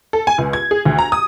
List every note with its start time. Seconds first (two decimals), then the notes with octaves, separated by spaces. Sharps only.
0.13 A4
0.27 G#5
0.38 C#2
0.53 G#6
0.71 G#4
0.85 D2
0.99 A#5
1.12 D#6